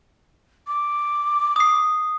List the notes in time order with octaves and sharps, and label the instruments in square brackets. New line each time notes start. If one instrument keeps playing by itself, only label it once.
[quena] D6
[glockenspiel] D#6 C7